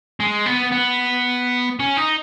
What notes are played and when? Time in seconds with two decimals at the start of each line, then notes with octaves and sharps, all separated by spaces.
0.20 G#3
0.46 B3
0.72 B3
1.80 C#4
1.97 D#4